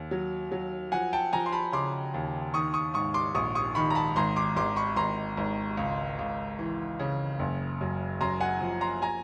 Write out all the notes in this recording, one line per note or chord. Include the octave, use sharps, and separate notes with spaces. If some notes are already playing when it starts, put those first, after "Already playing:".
Already playing: D#2
F#3
F#3
F3 F#5 G#5
G5 A5
F3 G#5 A#5
C6
A5 B5
C#3 C6 D6
D#2
D#3 C#6 D#6
C#6 D#6
G#2 C#6 D#6
C6 D6
A#1 C#6 D#6
C#6 D#6
D#3 B5 C#6
A#5
A5 B5
G#1 A#5 C6
C6 D6
G#1 C6 D6
B5 C#6
G#1 A#5 C6
G#1
C#2
C#2
E3
C#3
F#1
F#2
F#2 A#5 C6
F#5 G#5
F3
A#5 C6
G#5 A#5